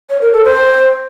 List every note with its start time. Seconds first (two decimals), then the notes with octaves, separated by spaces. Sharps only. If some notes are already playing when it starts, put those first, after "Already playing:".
0.10 C#5
0.21 A#4
0.33 A4
0.44 C5